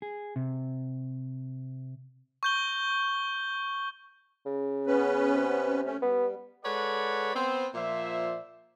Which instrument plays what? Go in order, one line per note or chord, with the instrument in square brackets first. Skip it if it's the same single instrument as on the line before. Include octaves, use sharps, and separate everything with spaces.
[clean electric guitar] G#4
C3
[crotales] C#6 G6 G7
[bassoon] C#3
[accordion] B3 C#4 B4
[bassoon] C3
[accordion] A3 C#4
[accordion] G3 [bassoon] B3
[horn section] G#3 A4 B4 C#5 D5 F#5
B3 C4 C5
A#2 F3 C5 D5 E5